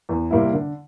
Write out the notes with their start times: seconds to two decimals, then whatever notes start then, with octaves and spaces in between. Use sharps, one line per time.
0.09 E2
0.31 C3 G3 A#3 E4
0.53 D3